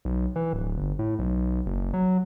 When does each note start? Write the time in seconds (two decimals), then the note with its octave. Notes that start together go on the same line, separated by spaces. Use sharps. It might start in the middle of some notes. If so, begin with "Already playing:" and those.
0.05 B1
0.36 E3
0.53 D1
0.77 G1
0.99 A2
1.19 B1
1.66 F#1
1.94 F#3